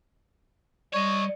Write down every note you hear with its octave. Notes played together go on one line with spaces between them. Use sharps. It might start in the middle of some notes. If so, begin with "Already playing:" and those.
G3 C#5 D#5 C#6